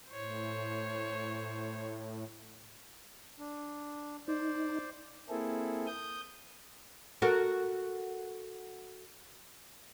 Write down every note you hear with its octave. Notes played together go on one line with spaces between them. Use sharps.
A2 C5 C#5
D4
D#4 C5 D5
A#3 C4 E4 G#4 A4
D#6 G6
F#4 A4 A#4